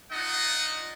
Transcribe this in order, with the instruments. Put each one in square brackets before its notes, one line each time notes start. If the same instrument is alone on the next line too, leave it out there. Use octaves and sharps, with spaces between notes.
[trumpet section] D4 D#4 F4 D#5 F#5